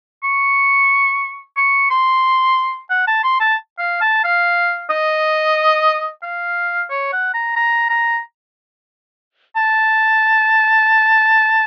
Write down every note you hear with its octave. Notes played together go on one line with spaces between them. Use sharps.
C#6
C#6
C6
F#5
A5
C6
A5
F5
A5
F5
D#5
F5
C#5
F#5
A#5
A#5
A#5
A5